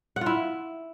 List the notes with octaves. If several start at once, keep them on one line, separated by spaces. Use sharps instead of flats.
F#5
F4
E4